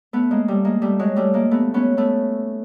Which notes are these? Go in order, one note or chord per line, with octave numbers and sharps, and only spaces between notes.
A3 B3
G#3 A#3
G3 A3
G#3 A#3
G3 A3
F#3 G#3
G3 A3
G#3 A#3
A3 B3
B3 C#4
A3 B3